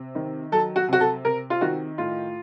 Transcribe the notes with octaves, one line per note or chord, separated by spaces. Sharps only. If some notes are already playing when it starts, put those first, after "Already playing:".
Already playing: C3
D#3
F#3 A4
F#4
C3 F#4
A4
C3 A#4
F4
D#3 F#4
A2 F4